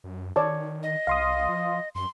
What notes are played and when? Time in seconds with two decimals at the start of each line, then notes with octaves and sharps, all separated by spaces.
0.04 F#2
0.36 D#3 C#5 D5 A5
0.83 D#5
1.07 C2 F5 C6 D#6
1.49 F3
1.95 F#2 C6